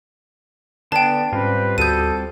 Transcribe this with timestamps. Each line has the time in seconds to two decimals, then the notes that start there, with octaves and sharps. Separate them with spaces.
0.92 D3 B3 D4 G5 A5
1.32 G#2 G3 C4 C#4 F4 B4
1.78 D2 F#4 A4 D#6 G6 D#7